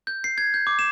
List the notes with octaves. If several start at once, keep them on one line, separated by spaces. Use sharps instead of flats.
G6
C7
G#6
G6
D6
E7